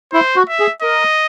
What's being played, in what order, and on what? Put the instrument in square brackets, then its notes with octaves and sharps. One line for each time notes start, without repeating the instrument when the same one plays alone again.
[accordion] E4 [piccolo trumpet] C5
[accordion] F#4
[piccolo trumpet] E5
[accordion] G#4
[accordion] A#4 [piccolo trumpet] D#5